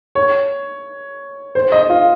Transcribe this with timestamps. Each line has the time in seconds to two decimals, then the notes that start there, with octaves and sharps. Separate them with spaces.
0.15 C#5
1.55 C5
1.72 D#5
1.90 F4